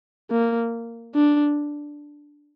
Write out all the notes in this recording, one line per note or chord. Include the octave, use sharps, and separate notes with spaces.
A#3
D4